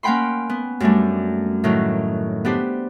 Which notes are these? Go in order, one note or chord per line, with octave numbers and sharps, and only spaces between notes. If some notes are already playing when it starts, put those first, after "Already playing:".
A#3 C#4 F#5 G5 B5 C6
B3
F#2 G3 A3 D4
A2 D#3 F#3
B3 D4 G4 C5